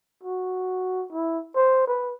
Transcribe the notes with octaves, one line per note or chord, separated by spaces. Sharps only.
F#4
E4
C5
B4